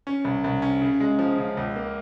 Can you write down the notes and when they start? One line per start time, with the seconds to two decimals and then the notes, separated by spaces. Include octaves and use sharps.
0.07 C#4
0.24 C2
0.44 C2
0.62 C#4
0.82 C#3
1.00 G#3
1.19 F3
1.38 C#3
1.57 C#2
1.76 A#3